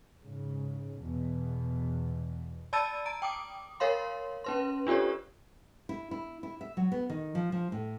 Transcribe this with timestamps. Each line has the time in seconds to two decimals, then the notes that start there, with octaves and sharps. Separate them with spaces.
0.22 G#2 C#3
1.01 E2 B2
2.73 D5 A5 B5 E6 A6 D#7
3.06 A#5 D7
3.22 G5 D6 D#6
3.80 A#4 C#5 F5 C6
4.44 C#4 B4 C6
4.87 D4 F4 G4 A4 C#5
5.89 E4
6.11 E4
6.43 E4
6.61 E5
6.77 F#3
6.92 B3
7.10 D#3
7.35 F3
7.52 F3
7.72 A2